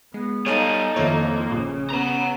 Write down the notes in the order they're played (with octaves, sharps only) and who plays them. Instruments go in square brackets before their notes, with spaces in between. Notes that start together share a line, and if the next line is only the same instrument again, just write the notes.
[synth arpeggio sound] G#3 [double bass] B3
[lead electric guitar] G3 G#5 [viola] D#4 A4 [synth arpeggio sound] C#5 F5 A5
[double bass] F2 [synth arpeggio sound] D#3 E4 C#5 [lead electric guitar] A#3
[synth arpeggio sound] A#1 [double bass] C#3
[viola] B3 [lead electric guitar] F#5 A#5